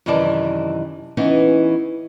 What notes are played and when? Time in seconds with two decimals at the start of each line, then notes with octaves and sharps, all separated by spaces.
0.06 F#2 C3 D#3 E3 D5 A5
1.17 E3 B3 C#4 D#4